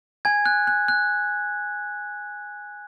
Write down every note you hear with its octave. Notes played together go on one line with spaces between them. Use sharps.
G#5 G#6
F#6
F#6
F#6